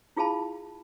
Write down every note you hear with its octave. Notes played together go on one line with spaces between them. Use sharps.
E4 F4 G#4 F5 A5 B5